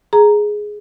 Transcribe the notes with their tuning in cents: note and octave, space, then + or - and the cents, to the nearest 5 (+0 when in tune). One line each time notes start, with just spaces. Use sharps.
G#4 +5 A#5 +0